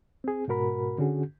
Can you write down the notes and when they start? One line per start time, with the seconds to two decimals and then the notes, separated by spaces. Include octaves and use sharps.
0.24 C4 G#4
0.48 G#2 B2 F#4 A#4 B5
0.98 D3 C#4 F#4 G#4